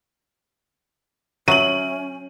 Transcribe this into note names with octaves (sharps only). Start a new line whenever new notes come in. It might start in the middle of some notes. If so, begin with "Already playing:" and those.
F#3 C#4 C#5 E5 D#7 F#7